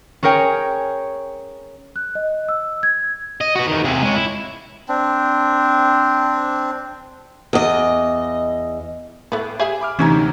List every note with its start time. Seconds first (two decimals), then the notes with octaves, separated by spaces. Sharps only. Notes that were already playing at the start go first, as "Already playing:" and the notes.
0.23 C#4 G#4 A#4 C#5 G5
1.96 F#6
2.15 D#5
2.49 E6
2.83 G#6
3.41 D#5
3.55 F#4 B4
3.67 E2 D#3
3.85 C3 G#4
4.02 G#3 C#4
4.15 E4
4.88 C4 D4
7.53 E2 D#5
9.32 A2 A3 B3
9.59 G4 G#4 E5
9.81 B5 D6 F6
9.99 D2 C3 E3 C#4 D#4 G#6